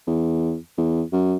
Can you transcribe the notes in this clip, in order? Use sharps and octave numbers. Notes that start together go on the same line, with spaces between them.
E2
E2
F#2